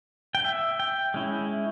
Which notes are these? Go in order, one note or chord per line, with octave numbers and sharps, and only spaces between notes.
G5
E5
G5
G#3 C#4 E4